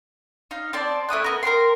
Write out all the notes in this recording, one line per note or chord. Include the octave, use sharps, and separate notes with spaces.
D#4 F5
C4 D5 A5
A3 E4 D#6 F#6
B3 A#4
A#4 C5 G5 C6